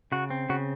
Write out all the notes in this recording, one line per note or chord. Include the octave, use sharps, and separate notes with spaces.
C#3 F#4
C4
C#3 F#4